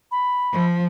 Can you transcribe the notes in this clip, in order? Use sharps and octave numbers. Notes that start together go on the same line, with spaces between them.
B5
F3